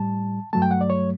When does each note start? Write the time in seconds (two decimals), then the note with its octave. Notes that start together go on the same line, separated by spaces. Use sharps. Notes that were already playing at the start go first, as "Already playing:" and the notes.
Already playing: A2 G3 A5
0.53 G2 F#3 A3 A5
0.62 G5
0.71 F#5
0.81 D5
0.90 C#5